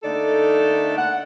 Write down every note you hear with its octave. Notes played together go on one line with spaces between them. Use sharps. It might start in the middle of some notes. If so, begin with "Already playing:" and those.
D3 A3 A#3 D#4 A4 D5
F#5